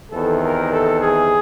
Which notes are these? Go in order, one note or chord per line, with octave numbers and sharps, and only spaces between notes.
E2 C3 D#3 A4
A#4
A4
G#4